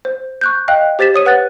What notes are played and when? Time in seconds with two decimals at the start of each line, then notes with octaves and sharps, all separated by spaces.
0.05 C5
0.41 C#6 F#6 G6
0.68 D#5 F5 G5 F#6
0.99 G4 C5 A6 B6 E7
1.14 C#5 D#6 D#7
1.26 B4 F#5 F#6 A6